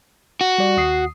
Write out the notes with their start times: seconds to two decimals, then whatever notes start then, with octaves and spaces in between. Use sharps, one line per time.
0.41 F#4
0.58 G3 D5
0.77 D#2 D#6 C7